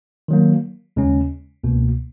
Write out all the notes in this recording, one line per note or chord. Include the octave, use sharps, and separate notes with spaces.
D#3 F#3 A#3
D#2 C#3 G#3 C#4
C#2 B2 A#3